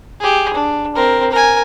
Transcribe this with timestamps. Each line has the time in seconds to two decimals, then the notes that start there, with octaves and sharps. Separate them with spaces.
0.21 G4 G#4
0.54 D4
0.95 C4 A#4
1.32 A#4 G#5